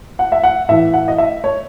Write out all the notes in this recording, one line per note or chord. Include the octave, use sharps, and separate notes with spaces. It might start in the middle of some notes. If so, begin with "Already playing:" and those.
F#5
E5
F#5
A2 E3 E5
F#5
D#5
E5
C#5